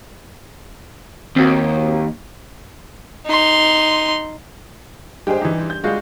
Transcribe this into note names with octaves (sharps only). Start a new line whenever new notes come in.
D#2 C4 F#4
D#4 C6
G2 G#3 G4 G#4 C5
E3 D#4 G4
C4
G6
G3 G#3 F4 F#4 G#4